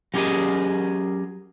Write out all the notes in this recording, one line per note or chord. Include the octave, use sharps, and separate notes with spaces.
F#3 C#4 G4 G#4 A#4 D#5